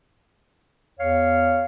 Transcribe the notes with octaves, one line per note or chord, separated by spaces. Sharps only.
E2 C#5 F5